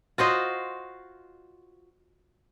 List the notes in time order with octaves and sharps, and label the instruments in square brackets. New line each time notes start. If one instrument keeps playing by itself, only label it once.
[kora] F4 F#4 C5 D#5